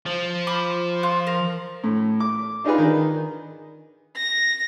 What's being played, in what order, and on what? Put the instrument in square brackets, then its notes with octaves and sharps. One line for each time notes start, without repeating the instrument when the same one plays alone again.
[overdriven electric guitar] F3
[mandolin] B5 D6
F4
A#4
[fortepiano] A2
D6
D4 D#4 F4 G#4 B4
D#3
[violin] A#6